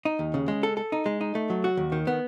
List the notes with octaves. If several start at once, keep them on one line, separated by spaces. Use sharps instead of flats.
D#4
D#2
C#3
G#3
A4
A4
D#4
G#3
D#4
A3
F#3
F#4
D#2
D#3
B3